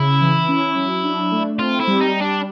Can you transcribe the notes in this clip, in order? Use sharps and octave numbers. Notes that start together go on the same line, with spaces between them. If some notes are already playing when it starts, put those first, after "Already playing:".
Already playing: C#3 E4
E3
C#4
F#3
D4
A3
C4 F4
E4
G3
D#4
G3
D4